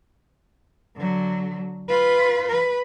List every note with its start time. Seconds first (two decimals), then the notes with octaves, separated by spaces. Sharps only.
0.96 D3 F#3
1.88 F4 B4
2.48 B4